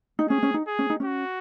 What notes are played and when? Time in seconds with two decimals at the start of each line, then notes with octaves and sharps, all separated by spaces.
0.19 D#4
0.29 C#4 G#4
0.43 C#4
0.54 D#4
0.67 G#4
0.79 C#4
0.90 D#4
1.00 C#4 F#4